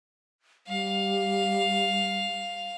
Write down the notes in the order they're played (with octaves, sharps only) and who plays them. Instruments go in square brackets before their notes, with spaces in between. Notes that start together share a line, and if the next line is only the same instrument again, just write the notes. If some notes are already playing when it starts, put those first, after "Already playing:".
[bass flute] G3 [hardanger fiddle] F5